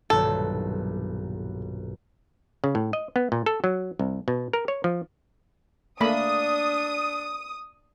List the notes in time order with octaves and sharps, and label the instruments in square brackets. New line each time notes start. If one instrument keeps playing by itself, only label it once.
[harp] D#1 B1 G2 [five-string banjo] A4
[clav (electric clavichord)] C#3
A2
D#5
B3
A#2
A4
F#3
C2
B2
A#4
C#5
F3
[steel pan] A3 A#3 B5 [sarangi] D4 [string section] D#6